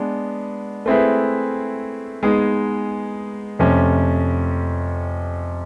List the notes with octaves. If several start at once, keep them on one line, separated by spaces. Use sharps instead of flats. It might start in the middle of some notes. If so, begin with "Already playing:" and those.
Already playing: G#3 B3 D4
A3 C4 E4 G#4 B4
G#3 B3 D#4 G#4
F2 C3 F3 A3 C#4